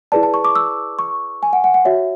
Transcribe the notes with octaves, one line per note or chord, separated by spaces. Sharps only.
E4 G#4 B4 D5 A5
A5
C#6
D6
E6
C#6
G#5
F#5
F#5
F#5
F#4 C#5 E5